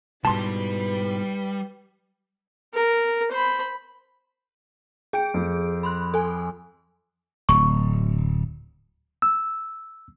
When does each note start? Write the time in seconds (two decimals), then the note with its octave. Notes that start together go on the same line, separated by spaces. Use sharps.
0.25 G#2 B2 G3 B4 A5 C6
2.74 A#4
3.31 C5 B5
5.13 G#4 G5 G6 D7
5.34 F2
5.83 B5 C6 F#6
6.14 A4 G#5
7.49 D1 C#6
9.22 E6